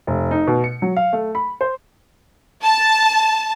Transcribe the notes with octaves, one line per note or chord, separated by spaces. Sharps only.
F1
D#4
B2
C#7
F#3
F5
A3
B5
C5
A5